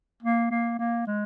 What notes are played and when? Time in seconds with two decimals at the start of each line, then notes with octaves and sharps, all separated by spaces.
0.23 A#3
0.51 A#3
0.79 A#3
1.07 G#3